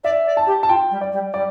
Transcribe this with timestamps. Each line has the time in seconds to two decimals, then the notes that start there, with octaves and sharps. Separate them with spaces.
0.04 D5 E5
0.26 D5
0.37 A5
0.47 G4
0.63 A5
0.69 F4 G5
0.91 G3
1.01 D5
1.12 G3
1.34 G3 D5